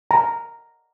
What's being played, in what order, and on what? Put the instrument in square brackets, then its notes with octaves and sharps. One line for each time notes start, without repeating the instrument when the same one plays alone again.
[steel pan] A#5